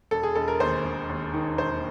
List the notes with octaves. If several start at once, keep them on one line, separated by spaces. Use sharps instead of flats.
E1 A4
G#4
E1 A4
A#4
D#2 C5
E1
D#2
D#3
E1 C5